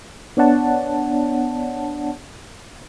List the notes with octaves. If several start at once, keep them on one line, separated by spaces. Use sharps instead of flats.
B3 D4 C#5 D5 F#5 A5